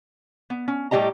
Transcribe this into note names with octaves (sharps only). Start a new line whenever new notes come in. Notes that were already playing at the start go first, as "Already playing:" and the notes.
B3
C#4
A2 G3 G#3 G4 D#5 A#5